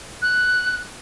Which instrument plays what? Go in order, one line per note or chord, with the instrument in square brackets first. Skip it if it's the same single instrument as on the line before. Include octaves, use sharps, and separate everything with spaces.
[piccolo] F#6